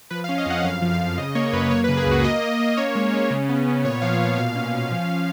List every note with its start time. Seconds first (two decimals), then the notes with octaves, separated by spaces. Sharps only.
0.10 F3 B4
0.24 F5
0.29 C#4
0.38 D#5
0.46 F2 F#5
0.64 F#2 F5
0.82 F3
0.91 F5
1.00 F#2
1.17 C#3 D#5
1.35 A#3 C#5
1.53 F#2 B4
1.71 A#3 C#5
1.84 B4
1.89 C#3
1.97 G#4
2.06 C#2 F#4
2.24 A#3 D#5
2.42 A#3
2.60 A#3
2.77 C#4 C#5
2.95 G#3
3.13 C#4
3.31 C#3
3.49 B3
3.66 B3
3.84 A#2 C#5
4.02 F3 F5
4.20 A#2
4.38 B2 F5
4.55 C#4
4.74 C#4
4.91 F3